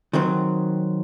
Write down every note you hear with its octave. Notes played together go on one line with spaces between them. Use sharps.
D#3 F#3 C4